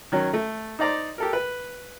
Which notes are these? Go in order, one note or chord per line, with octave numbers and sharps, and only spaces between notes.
D#3 F#3 C#4
A3
D#4 C5 D5 A#5 D6
G4 A4 A#4
B4